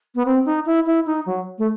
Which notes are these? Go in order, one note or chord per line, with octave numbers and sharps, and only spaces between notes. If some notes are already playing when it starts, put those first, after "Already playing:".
B3
C4
D#4
E4
E4
D#4
F#3
A3